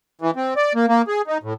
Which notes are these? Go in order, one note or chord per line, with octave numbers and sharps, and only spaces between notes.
E3
C4
D5
A#3
A#3
G#4
D#4
A2